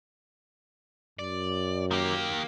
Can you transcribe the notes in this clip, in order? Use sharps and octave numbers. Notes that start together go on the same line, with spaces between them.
F#2 D5
D#3 A#3 G4